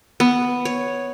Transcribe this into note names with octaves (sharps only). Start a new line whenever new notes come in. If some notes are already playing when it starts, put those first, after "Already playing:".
B3
C#5